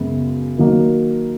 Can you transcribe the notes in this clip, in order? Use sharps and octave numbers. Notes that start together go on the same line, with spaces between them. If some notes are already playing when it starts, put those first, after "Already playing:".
Already playing: F#2 C#3 G#3 B3
D#3 F#3 A#3